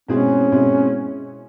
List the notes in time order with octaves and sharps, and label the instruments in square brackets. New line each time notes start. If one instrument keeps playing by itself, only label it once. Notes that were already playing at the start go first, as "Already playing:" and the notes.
[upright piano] B2 G#3 C4 E4 G#4 [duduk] C#4
[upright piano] B2 G#3 C4 E4 G#4